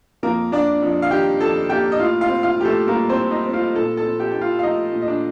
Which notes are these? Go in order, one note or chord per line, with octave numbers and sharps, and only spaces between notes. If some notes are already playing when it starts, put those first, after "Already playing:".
F2 A#3 A#4
A#3 D4 D5
F2
F5
D#3 G4 G5
F2 A4 A5
A#3 G4 G5
D#5
A2 F4 F5
F4 F5
C4
F4 F5
A2 G4
A3 A4
G3 A#3 A#4
C4 C5
A2
D#4 D#5
C4
F4 F5
A#2 A4 A5
A4 A5
C4
G4 G5
A#2 G5
F4 F5
F5
A3 D#4 D#5
A#2
D#5
D4 D5